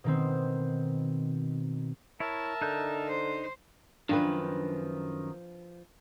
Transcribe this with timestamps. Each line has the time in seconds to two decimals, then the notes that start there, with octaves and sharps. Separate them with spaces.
0.04 B2 D#3 C4
2.20 E4 A#4 C#5 E5 A5
2.61 D3 D#4 F#6 G6
3.08 C5
4.09 F#2 D#3 F3 C4 D4 B4